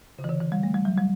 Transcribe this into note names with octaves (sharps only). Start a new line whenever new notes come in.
C#3
E3
D3
E3
G3
A3
G3
F#3
G3